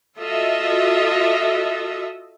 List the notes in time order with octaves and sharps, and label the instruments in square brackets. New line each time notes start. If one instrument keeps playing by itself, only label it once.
[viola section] F4 F#4 A4 D#5 E5